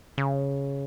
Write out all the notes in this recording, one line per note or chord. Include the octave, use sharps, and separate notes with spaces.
C#3